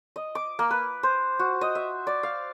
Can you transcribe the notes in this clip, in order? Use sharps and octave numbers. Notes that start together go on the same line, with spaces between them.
D#5
D6
A#3
B4
C5
F#4
D#5
E5
D5
F5